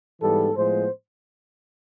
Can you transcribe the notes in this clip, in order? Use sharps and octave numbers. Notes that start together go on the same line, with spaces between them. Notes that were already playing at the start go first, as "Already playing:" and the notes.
G#2 E3 G3 B3 A4
A2 F3 G#3 B3 C5